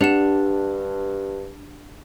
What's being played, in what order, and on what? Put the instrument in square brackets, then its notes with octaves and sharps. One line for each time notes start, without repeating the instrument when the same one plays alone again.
[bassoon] G2 [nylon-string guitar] D4 [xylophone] G4 F#5 E7